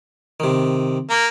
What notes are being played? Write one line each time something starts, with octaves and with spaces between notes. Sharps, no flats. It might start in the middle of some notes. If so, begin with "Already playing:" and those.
C3 D#3
A#3